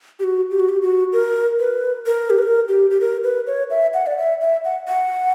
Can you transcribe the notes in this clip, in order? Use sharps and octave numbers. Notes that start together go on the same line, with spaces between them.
G4
F#4
G4
F#4
G4
F#4
A#4
B4
A#4
G4
B4
A#4
G4
G4
A#4
B4
C#5
E5
F#5
D5
E5
E5
F#5
F#5